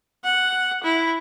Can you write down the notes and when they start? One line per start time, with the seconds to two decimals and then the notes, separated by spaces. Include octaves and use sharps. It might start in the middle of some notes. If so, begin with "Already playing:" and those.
0.24 F#5
0.83 E4